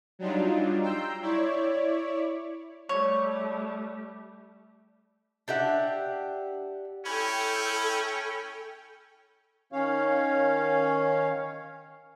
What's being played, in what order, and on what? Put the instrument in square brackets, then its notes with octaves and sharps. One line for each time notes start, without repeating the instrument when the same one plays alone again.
[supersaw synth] F#3 G3 D4 D#4 F4
G5 A#5 C6 E6 G6
E4 C#5 D5
[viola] G3 A3 [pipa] C#5
[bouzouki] D4 G4 E5 F#5
[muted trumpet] C#4 [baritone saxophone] E4 [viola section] A4 G5
[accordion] D#3 C#4 C#5 F5